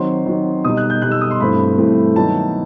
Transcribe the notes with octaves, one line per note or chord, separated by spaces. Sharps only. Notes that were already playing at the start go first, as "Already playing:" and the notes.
Already playing: D#3 F#3 C4 C6
D#3 F#3 C4
B2 G3 D#4 D#6
F#6
G6
B2 G3 D#4 F#6
E6
D#6
C6
G2 E3 A3 C4 B5
G2 E3 A3 C4
D#3 F#3 B3 E4 A5